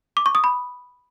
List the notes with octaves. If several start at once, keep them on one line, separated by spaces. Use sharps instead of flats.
D6
C#6
D#6
B5